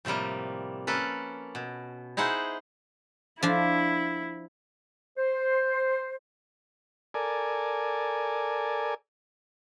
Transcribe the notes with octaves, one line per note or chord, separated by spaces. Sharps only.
A2 C3 F3 G3 A#3
A#3 C#4 A4 B4
B2
D#4 E4 G#4 C5 F#5
F3 D4 E4
C5
A4 A#4 D5 G#5